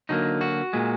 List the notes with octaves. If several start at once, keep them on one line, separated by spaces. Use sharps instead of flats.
D3 F#3 A#3 D#4
F#4
A#2 G#3